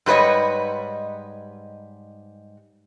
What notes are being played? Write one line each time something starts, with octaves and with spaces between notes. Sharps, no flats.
G#2 G3 B4 C#5 D#5